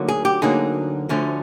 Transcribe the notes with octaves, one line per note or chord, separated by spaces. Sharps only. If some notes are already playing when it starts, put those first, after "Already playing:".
Already playing: D2 D3 F#3 A#3 D#4
G#4
G4
D2 D3 F#3 A#3 D#4 G#4
D2 D3 F3 A3 C#4